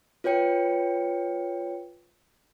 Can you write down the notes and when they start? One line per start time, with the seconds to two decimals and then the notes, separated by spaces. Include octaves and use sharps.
0.24 F4 B4 C#5 G5 C#7